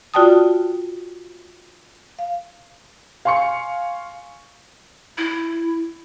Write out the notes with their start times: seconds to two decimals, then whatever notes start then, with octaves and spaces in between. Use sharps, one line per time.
0.14 F4 F#4 D5 G5 A5 D#6
2.19 F5
3.25 F5 G#5 C6 C#6 C#7
5.18 E4